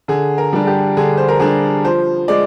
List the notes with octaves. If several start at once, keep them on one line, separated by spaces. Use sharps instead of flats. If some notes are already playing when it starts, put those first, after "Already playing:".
D3 G#4
A#4
G3 D4
G4
D3 G#4
C5
A#4
G3 D4 G#4
F3 C5
G#3 D5